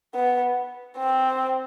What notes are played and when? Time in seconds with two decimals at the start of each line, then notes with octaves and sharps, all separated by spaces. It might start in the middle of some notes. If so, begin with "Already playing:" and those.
0.15 B3
0.97 C4